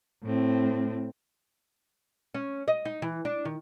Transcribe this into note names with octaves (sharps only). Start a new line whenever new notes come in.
A2 C4
C#4
D#5
D#4
E3
D4
D#3